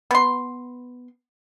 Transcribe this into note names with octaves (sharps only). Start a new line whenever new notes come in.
B3 C6